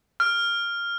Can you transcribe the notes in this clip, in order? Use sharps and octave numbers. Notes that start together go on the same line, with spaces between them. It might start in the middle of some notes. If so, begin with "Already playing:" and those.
F6